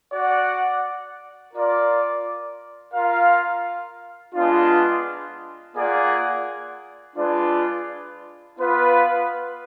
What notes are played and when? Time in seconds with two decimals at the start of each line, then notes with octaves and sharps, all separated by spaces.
0.11 F#4 D5 F#5
1.52 F4 A#4 D5
2.93 F4 A#4 F5
4.34 G#3 B3 D4 F4
5.75 A#3 F4 G#4 D5 F#5
7.16 G#3 D4 F4 B4 D5
8.58 B3 F4 B4 F5